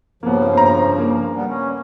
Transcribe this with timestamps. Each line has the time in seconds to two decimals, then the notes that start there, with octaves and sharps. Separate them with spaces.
0.23 G2 C#3 F3 A#3 B3
0.53 C5 A#5
0.98 A#3
1.36 G3 B3
1.49 C#4